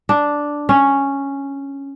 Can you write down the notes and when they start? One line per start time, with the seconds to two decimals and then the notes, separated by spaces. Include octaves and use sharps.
0.09 D4
0.69 C#4